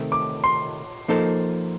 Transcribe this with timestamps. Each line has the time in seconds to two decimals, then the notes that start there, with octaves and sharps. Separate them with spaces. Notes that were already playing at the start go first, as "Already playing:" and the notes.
Already playing: C3 D#3 A3 C4
0.12 D6
0.44 C6
1.08 F3 A#3 D#4 A4 C5